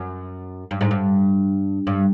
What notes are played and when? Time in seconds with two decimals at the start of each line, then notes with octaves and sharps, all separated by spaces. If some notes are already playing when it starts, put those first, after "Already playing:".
Already playing: F#2
0.71 G2
0.81 G#2
0.91 G2
1.87 G2